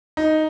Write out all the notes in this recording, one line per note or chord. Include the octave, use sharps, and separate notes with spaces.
D#4